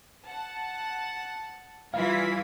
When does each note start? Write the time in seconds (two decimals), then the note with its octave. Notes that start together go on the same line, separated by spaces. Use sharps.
0.24 F#5 A5
1.94 E3 G3 E4 F4 F5 G#6 B6